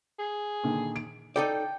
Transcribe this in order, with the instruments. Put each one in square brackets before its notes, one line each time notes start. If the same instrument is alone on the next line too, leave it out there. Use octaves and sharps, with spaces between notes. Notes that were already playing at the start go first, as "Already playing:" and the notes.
[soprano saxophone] G#4
[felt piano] A#2 D3 D#3
D7
[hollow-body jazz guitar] D#4 A4 D5 [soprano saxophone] G5